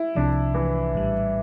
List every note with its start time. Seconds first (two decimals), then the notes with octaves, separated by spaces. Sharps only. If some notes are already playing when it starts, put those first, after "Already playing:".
Already playing: E4
0.15 C2 C3 F3 D4
0.54 E3
0.93 A#1 A2 G3